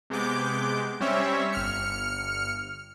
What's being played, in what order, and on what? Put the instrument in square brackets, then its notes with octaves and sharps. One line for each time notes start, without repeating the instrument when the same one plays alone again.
[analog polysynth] C3 G#3 B3 D6 G6
G3 C4 C#4 C#5 E5
G1 F6 C#7